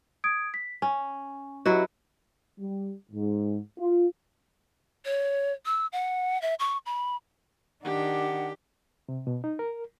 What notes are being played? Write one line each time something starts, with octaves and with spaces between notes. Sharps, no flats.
D#6 G#6 D7
B6
C#4 G#5
F#3 E4 F#4 G4 B4 D#5
G3
G#2
F4
C#5
E6
F#5
E5
C#6
B5
D#3 D4 G4 F#5
C3
B2
D#4
A#4